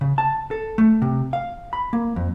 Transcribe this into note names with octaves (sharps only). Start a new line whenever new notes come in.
C#3
A5
A4
A3
C3
F5
B5
A#3
F2